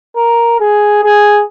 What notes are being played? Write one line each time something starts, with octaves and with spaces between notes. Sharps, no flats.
A#4
G#4
G#4